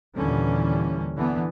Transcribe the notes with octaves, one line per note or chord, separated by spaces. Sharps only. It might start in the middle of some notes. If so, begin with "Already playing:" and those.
D#2 A#2 D3 E3 G3 C#4
D3 E3 B3